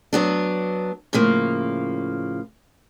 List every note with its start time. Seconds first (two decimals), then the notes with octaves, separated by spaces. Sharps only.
0.13 F#3 B3 D4
1.13 A2 C#3 F3 A#3